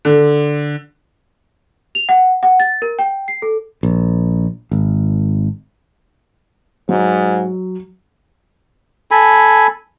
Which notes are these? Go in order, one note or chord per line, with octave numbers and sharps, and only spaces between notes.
D3
F7
F#5
F#5
A6
A#4
G5
C7
A4
A#1
G#1
G#2 F#3
A4 G#5 B5